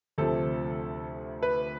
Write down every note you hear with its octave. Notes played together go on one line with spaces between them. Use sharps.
D2 C3 F3 A3 A4
B4